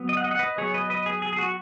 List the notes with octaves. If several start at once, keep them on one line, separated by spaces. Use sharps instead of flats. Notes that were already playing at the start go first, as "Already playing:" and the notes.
Already playing: F#3 B3
D#5
F#5
D#5
F#5
B4 D#5
F#3 B3 G#4 C#5
B4 D#5
B4 D#5
G#4
G#4
G#4
F#4